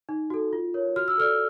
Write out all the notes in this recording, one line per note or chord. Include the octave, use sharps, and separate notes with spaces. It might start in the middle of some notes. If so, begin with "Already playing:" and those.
D#4
F#4 A4
F4
A#4 C#5
F#4 F6
E6
A4 D5 F6